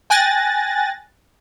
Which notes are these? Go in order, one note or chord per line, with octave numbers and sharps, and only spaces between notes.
G5 G#5 F#6 A6 A#6